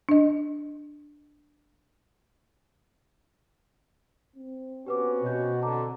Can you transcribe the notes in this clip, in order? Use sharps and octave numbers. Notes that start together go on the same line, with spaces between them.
D4 D#5
C4
B3 C#4 F#4 G4 B4 D6
B2 C#5 G6
D3 A5 A#5 D6